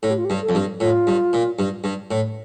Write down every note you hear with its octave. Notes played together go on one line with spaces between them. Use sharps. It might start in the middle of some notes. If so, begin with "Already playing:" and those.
A2 A4
G4
F4
G4
G2
A4
F2
G2
A2 F4
G2
A#2
G2
G2
A2